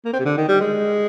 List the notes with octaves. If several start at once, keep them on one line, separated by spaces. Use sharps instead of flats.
A#3
C4
C3
D3
D#3
G3
G#3